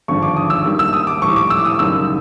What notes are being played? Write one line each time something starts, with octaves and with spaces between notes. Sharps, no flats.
G#1 G2 D3 F3 C#6
D6
D#6
E6
G#2 D#3 G3 A#3
E6
D#6
D6
A#1 A2 E3 G3 C#6
D6
E6
D#6
F#1 F#2 D#3 G3 E6